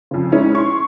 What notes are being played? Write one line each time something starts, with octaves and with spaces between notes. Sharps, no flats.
F2 C#3
G#3 C#4 D#4 E4
C6 C#6